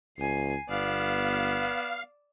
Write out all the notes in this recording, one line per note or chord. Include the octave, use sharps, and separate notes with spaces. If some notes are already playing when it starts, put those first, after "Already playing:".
C#2 G#5 C7
G1 B3 D5 F5 E6